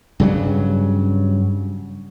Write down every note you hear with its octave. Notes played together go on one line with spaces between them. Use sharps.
G2 C#3 F#3